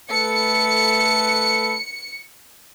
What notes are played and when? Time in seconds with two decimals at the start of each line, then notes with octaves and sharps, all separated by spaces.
0.11 A3 A4 B4 C#7